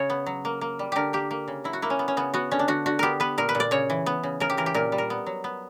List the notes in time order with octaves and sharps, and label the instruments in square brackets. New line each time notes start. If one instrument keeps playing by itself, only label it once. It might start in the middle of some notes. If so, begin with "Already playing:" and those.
Already playing: [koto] C#3 C#5
B3
F#3
A#3
A#3
G3
D3 G4 A#4
A#3 G4
A#3
C#3
F#3 E4
F#4
A#3 E4
C#4
B3
C#4
C#3 B3
B3 F#4
D3 C#4
D4
D3 F#4
D3 F#4
B3 G4 A#4
B3 B4
A#2 A#4
B4
A#2
D5
C#3 C#5
E3
B3
C#3
C#3 A#4
G4
E3 A#4
G4
A#2 A#4
G3
A#4
B3
F#3
B3